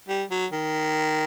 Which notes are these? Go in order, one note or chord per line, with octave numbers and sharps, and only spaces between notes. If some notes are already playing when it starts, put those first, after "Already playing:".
G3
F#3
D#3